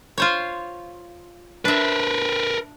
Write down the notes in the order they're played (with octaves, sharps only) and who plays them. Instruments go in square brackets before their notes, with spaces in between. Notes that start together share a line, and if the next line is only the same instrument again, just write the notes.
[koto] F4 C5 C#5
[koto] D4 E5 [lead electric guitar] A#4 B4